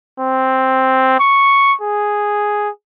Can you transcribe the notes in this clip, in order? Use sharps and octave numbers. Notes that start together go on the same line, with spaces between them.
C4
C#6
G#4